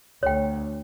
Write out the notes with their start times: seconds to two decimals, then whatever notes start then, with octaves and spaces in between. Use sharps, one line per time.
0.23 D2 C#5 G5